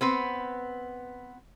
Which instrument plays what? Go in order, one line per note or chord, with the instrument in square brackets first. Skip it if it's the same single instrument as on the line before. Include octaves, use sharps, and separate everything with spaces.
[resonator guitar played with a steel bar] B3 C4 B4